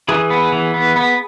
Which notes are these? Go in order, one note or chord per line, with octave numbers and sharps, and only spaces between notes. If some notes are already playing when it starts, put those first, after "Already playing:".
E3 G#4
B3
E3
B3
B3